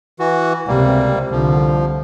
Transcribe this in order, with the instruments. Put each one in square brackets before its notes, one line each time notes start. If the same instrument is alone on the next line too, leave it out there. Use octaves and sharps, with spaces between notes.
[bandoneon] E3 F#4
[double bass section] C#2 C3 [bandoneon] G3 A#3
[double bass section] C2 D3 [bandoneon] F3